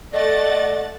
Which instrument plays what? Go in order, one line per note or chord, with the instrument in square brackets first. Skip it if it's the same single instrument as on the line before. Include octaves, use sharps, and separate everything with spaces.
[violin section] A3 F#5 A6 [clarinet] D5 [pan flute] D#5